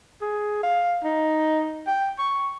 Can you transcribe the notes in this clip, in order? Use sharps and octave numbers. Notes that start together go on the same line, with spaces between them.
G#4
F5
D#4
G5
C#6